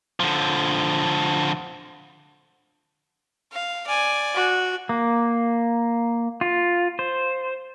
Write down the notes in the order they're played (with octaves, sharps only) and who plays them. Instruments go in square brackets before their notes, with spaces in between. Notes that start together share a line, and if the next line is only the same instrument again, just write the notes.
[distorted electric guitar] D3 F3
[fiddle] F5
D5 G#5
[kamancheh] F#4
[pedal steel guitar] A#3
F4
C5